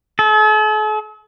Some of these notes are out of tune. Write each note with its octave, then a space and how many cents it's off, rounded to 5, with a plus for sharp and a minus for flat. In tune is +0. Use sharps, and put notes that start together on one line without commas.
A4 -45